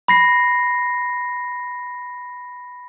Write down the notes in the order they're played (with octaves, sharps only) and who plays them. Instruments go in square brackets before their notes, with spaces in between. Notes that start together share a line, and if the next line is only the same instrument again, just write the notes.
[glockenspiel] B5 A#6 C7